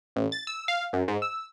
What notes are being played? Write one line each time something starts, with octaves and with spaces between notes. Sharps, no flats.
A1
A6
E6
F5
F#2
G#2
E6